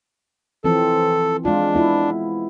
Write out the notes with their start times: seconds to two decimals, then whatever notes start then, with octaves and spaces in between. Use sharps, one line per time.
0.64 E3 F3 C4 A4
1.45 G#3 D4 F4
1.75 B3 E4 F4